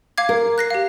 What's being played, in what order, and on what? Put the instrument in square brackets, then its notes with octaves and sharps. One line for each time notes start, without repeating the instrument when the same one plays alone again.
[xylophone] F5 D6 G#6
[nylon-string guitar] A#4
[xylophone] F#6 A#6 C7
G4 F5